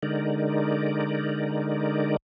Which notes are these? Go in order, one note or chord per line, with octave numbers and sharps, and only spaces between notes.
D3 G#3 D#4 A#4 D5